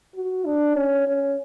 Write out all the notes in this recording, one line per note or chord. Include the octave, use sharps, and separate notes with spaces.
F#4
D4
C#4
C#4